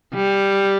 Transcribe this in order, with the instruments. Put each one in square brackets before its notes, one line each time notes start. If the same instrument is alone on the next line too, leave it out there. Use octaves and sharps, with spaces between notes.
[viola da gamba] G3